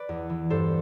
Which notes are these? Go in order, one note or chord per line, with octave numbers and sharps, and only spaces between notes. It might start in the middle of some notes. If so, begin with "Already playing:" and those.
Already playing: B4 D5
E2
E3
G2 A4 C5